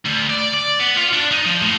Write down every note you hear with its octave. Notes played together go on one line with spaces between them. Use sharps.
D2
D5
D5
B3
F4
D4
D#4
F3
A2